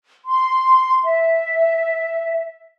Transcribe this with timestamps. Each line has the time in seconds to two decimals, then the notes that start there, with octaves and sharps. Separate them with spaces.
0.26 C6
1.05 E5